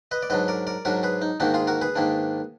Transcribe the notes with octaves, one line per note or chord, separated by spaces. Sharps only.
B4 D#5
D5
G#2 F#3 D4 B4 D#5
A#4 D5
A#4 D5
G#2 F#3 D4 F#4 A#4
G#4 B4
D#4
G#2 D#3 A#3 D4 D#4 F#4
F4 G#4
F#4 A#4
G#4 B4
G#2 D#3 A#3 D4